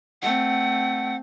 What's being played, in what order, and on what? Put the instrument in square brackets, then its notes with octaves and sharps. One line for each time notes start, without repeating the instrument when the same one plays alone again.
[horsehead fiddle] A3 C4 [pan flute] F#5